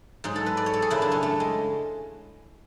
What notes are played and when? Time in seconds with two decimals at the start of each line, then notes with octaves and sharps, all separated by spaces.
0.24 G#2 F#3 G#4
0.36 A4
0.46 B4
0.57 D5
0.66 C#5
0.74 A4
0.82 G#4
0.90 F#2 C#3 F#3 E4
1.02 D4
1.12 C#4
1.23 A3
1.40 G#3